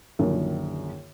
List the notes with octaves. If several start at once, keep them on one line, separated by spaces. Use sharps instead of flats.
A#1 F#2 D3 D#3 F3